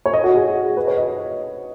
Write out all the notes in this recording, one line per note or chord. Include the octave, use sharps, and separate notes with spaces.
C#5
D#5
F#4
G#4
B4
C#5
D#5